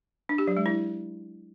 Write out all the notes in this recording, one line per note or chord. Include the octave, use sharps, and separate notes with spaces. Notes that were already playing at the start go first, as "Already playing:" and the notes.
D4
G4
F#3
G#3
E4